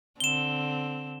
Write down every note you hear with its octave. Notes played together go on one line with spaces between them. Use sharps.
D3 C4 E7 G7